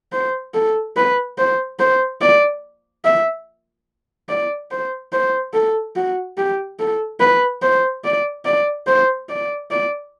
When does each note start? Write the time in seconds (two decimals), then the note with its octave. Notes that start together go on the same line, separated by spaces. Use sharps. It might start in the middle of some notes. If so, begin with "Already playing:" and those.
0.12 C5
0.54 A4
0.96 B4
1.38 C5
1.79 C5
2.21 D5
3.05 E5
4.29 D5
4.71 C5
5.13 C5
5.53 A4
5.96 F#4
6.37 G4
6.79 A4
7.20 B4
7.62 C5
8.04 D5
8.45 D5
8.87 C5
9.29 D5
9.71 D5